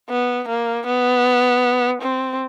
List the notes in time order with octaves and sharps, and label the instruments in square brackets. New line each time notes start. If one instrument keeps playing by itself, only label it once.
[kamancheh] B3
A#3
B3
C4